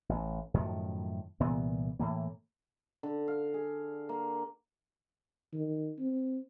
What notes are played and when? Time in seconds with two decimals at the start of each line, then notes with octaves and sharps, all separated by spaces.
0.09 A1
0.54 F#2 A2 D#3 F3
1.40 C2 A#2 E3 B3
2.00 A2 E3 A#3
3.03 D3
3.28 F5
3.54 G#4
4.09 A#3
5.54 D#3
5.99 C4